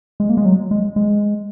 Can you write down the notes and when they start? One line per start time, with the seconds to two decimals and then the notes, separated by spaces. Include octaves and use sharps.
0.20 G#3
0.30 A#3
0.37 G#3
0.45 F#3
0.71 G#3
0.96 G#3